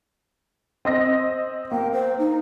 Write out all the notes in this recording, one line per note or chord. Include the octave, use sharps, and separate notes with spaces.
C4 D#5 A#6
A#3 G5
C5
D#4